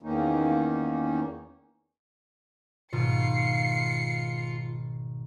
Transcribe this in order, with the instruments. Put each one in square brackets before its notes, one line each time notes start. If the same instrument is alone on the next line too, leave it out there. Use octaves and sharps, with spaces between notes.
[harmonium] E2 D#3 A#3 C#4 D#4
[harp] G#1 B2 [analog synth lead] F4 [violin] C7 C#7